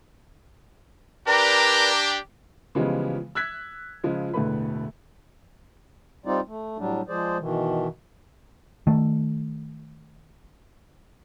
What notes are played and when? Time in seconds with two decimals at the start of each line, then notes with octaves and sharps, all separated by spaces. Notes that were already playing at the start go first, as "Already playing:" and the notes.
1.27 D4 G4 A#4 B4 D5 A#5
2.75 C#3 E3 F3 G3 G#3 B3
3.35 E6 F#6 G#6 B6
4.04 C#3 F3 G#3
4.33 E1 A2 D3 A3 B4 B5
6.26 G3 C4 D#4 F4 D5
6.47 A3
6.78 A2 F#3 G3 D4
7.08 F3 G#3 G#4 C5 D5
7.39 B2 D#3 E3
8.87 D#3 A3